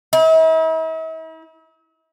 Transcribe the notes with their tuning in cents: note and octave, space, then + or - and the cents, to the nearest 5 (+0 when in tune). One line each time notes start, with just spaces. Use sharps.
E4 -45